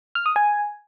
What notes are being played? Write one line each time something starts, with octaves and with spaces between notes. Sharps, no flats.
F6
D#6
G#5